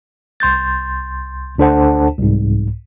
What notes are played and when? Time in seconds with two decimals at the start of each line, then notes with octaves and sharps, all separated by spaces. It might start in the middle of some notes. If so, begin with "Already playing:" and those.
0.40 C2 C6 G6 A6
1.58 D2 D4 A4 C5 F#5 A5
2.19 C2 G#2